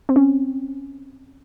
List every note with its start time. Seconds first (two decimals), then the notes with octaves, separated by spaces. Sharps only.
0.09 C4
0.16 C#4